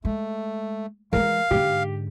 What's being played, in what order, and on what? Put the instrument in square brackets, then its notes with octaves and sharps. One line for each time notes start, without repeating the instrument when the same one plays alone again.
[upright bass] G#3 [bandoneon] A3
[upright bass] E3 G#3 [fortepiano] A#4 [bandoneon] F5
[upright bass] G#2 D3 [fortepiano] G4